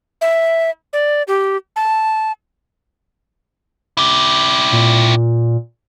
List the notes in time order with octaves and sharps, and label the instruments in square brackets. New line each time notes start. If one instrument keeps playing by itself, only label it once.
[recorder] E5
D5
G4
A5
[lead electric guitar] E4 G4
[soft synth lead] A#2